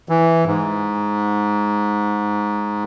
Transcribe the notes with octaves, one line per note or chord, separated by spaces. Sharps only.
E3
G#2